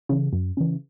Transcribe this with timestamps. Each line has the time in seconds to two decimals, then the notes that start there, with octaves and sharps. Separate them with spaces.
0.09 C#3 E3
0.33 F#2
0.57 C#3 E3